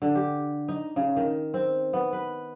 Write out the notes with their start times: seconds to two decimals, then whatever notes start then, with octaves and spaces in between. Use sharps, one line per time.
0.02 D3
0.15 G4
0.68 D#4
0.96 C#3
1.16 D#3
1.54 C4
1.93 B3
2.13 B4